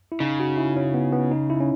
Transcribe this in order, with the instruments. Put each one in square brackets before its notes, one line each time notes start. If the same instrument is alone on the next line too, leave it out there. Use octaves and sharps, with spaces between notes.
[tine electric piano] E4
[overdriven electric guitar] C#3 [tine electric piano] D#4
[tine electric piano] F#4
E4
C#4
B3
B3
D#4
E4
C#4